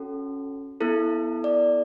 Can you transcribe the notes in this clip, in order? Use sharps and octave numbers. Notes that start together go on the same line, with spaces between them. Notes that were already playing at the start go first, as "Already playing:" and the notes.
Already playing: C#4 F#4 A4
B3 E4 A4
D5